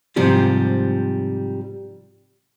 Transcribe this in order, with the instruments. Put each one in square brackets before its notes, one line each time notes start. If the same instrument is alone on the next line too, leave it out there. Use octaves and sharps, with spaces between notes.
[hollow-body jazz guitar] G#2 C3 F3 G3